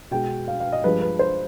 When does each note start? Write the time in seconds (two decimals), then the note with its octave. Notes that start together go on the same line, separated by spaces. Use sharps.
0.11 B2 G#3 G5
0.48 F5
0.60 F5
0.72 D#5
0.84 G2 F3 G#3 B4
1.01 B4
1.19 C5